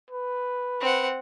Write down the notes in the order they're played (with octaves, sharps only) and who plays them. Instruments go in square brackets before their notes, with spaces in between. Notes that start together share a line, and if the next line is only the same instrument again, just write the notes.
[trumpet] B4
[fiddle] C4 F#5